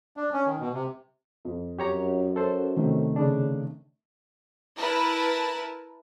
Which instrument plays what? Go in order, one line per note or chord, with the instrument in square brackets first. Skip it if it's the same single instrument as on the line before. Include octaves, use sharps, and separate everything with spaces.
[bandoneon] D4
C#4
D#3
B2
C3
[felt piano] F2
[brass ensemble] F#2 [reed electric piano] G4 C#5 A#5
[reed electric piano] A4 C5
[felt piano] C3 D#3 A3
[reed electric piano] C#3 D4
[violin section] E4 A#4 B4 A5